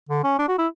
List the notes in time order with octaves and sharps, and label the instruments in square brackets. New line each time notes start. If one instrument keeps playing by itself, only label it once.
[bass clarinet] D3
C#4
D4
F#4
E4